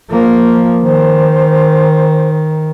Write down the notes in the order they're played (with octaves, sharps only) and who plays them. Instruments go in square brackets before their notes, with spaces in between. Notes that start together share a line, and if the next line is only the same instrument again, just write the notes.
[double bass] F3 A#3
[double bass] D#3 [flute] C5